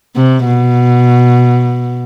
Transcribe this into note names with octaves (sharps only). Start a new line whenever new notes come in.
C3
B2